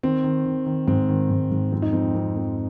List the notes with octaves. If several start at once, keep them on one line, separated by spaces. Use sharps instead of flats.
D#3 C4
D#3
D#3
D#3
G#2 C4
D#3
G#2
G#2
F2 C4
D#4
F2 C4
F2
F2